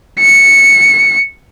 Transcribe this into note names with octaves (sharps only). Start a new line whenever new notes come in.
C#7